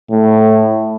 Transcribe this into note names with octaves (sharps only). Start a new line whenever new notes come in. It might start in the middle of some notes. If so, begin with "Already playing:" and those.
A2